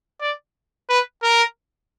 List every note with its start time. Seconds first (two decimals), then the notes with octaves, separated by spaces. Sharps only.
0.21 D5
0.89 B4
1.23 A#4